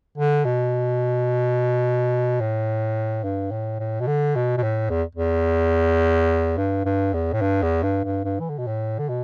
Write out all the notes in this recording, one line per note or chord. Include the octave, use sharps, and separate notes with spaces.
D3
B2
A2
G2
A2
A2
B2
D3
B2
B2
A2
E2
E2
G2
G2
E2
A2
G2
E2
G2
G2
G2
E3
D3
B2
A2
D3
B2